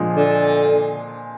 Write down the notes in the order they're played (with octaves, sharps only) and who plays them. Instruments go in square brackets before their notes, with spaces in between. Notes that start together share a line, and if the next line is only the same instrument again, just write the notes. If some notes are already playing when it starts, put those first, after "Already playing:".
Already playing: [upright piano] A#2 F3 G#3 D4 G#4
[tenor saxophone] D3